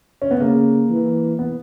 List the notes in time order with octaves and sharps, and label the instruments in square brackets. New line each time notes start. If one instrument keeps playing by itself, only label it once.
[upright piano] C#4
B3
[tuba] C#3 [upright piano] A#3
[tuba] E3
[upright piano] B3